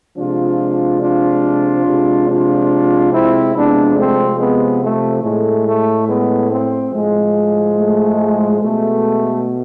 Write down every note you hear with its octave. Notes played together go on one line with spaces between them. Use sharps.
C3 F3 G#3 D4 F4
D4 F4
C3 F3 G#3
D4 F4
C4 E4
C3 F3 G#3 B3 D4
A3 C4
G#3 B3
A3
A2 G#3 A3
A3
G#3 B3
A3 C4
A2 F3 G#3
A3
B2 G#3 A3